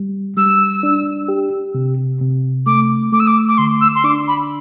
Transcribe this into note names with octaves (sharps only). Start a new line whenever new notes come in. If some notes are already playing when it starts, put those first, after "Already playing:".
Already playing: G3
G3 E6
D4
G4
C3
C3
A3 D6
A3 D6
E6
D6
D6
D3 C6
E6
C6
D4 D6
B5